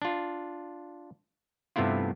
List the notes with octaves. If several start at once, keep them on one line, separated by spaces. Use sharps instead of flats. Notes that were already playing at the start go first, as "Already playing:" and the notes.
D4 F4
G2 C3 A3 B3 E4 F4